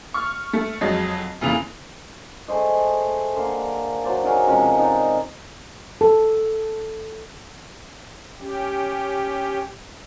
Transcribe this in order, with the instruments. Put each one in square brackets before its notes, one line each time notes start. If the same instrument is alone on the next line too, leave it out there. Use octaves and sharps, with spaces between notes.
[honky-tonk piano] C#6 F6
A3
F2 F#3 G#3 D#5
F1 A#2 C#3 E3 F7
[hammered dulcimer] A3 G#4 C5 D#5
D3 A#3 C6
F#3 C5 D5 A5
D#4 F#4 G#4 A#4
C3 F3 G#3 C#4
D#4 D5
[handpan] A4
[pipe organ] C#4 G4